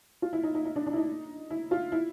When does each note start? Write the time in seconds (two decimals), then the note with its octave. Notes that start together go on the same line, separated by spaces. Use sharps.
0.22 F4
0.33 E4
0.43 D#4
0.55 D#4
0.65 D#4
0.76 D4
0.86 D4
0.93 E4
0.96 D#4
1.50 E4
1.71 F4
1.92 E4